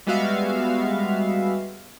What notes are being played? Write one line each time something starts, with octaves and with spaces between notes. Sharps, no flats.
G3 G#3 B3 F#4 E5 F5